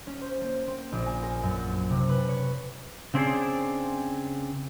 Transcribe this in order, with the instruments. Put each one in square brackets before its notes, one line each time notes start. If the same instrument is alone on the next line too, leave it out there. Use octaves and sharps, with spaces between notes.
[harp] C#4
C5
A#3
C4
A#1
G#5
A#4
F#2
C3
B4
C#5
[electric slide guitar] C#3 C4 D4 G#4 C5